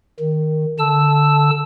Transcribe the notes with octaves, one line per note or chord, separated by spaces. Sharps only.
D#3
D3 A5 E6